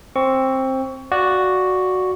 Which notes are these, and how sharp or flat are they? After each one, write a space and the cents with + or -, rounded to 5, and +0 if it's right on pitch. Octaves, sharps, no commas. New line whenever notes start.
C4 +15 C#6 +20
F#4 +0 D5 +0 F5 +0